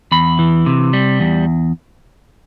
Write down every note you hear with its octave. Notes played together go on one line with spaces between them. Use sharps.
E2 B5
E3
C3
G3
E2